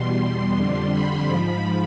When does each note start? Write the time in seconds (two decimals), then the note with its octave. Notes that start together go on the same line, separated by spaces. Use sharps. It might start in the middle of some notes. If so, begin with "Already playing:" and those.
Already playing: E2 B2 G3 C6
0.57 F2 D3 G3 C6
0.91 B5
1.26 G#2 F3 B5